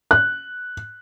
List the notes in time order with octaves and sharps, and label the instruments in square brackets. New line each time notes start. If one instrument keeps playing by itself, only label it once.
[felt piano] F#6